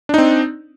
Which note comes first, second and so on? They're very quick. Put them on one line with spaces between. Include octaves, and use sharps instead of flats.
D4 D#4 C4